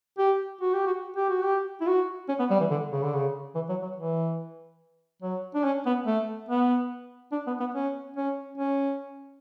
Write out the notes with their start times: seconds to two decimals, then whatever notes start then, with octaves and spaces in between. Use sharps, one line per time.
0.18 G4
0.61 F#4
0.74 G4
0.86 F#4
1.16 G4
1.29 F#4
1.43 G4
1.81 E4
1.87 F#4
2.29 C#4
2.39 B3
2.50 G3
2.60 E3
2.70 D3
2.92 C#3
3.02 D3
3.14 C#3
3.55 E3
3.69 F#3
3.82 F#3
3.96 E3
5.22 F#3
5.55 D4
5.64 C#4
5.86 B3
6.06 A3
6.49 B3
7.32 D4
7.47 B3
7.60 B3
7.75 C#4
8.16 C#4
8.58 C#4